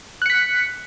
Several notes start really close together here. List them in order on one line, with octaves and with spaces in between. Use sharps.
F#6 C#7 B6